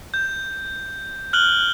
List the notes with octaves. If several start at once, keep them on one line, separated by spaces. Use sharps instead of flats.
G6
F6 F#6 F#7 G7